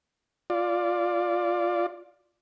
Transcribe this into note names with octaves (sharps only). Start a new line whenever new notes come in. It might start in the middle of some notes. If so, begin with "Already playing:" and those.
F4 D5